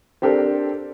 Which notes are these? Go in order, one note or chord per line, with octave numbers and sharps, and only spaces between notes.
C4 D4 G4 A4 A#4 C5